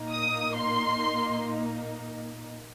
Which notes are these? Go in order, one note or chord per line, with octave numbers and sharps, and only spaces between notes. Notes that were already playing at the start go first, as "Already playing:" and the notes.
Already playing: A#2 A#3 D#4
D#6
C6